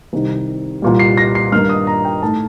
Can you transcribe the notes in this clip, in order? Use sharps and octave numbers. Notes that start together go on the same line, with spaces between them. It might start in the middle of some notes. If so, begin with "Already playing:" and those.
C2 C3 D#3
C2 A#2 G3
C7
A#6
C7
G2 D#3 A#3 D#4 F6
D#6
A#5
G5
A2 A3 D#4 A5